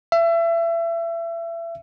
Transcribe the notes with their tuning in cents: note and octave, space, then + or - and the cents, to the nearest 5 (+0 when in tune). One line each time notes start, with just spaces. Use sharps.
E5 +30